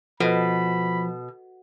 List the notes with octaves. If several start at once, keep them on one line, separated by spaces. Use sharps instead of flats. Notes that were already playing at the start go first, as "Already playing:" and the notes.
B2 F3 A4 B4 D#5 B5